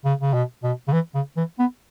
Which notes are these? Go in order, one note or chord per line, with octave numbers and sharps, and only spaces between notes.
C#3
C#3
B2
B2
C#3
E3
C#3
E3
B3